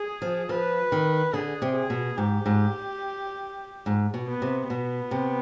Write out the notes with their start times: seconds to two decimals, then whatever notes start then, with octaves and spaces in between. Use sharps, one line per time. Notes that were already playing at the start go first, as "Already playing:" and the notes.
Already playing: G#4
0.22 F3
0.49 F3 B4
0.92 D#3
1.33 D3 G#4
1.62 C3
1.76 G#4
1.90 B2
2.17 G#2 G4
2.46 G#2
3.86 G#2
4.14 B2
4.27 B3
4.42 C3
4.70 B2 B3
5.11 C3